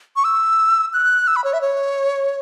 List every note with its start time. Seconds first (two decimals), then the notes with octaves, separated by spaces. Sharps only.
0.16 C#6
0.24 E6
0.93 F#6
1.27 E6
1.36 B5
1.44 C#5
1.53 E5
1.61 C#5